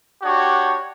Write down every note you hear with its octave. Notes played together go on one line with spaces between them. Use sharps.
D4 F#4 G4 C#5